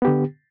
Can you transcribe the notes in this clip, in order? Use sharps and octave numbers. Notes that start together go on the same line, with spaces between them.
D3 B3 G4